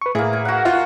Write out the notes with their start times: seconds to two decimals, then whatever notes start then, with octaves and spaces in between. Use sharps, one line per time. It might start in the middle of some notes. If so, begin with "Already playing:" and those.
0.02 B4 C#6
0.15 A2 E3 A#3 G#4
0.33 G#5
0.45 F#4 F#5
0.65 F4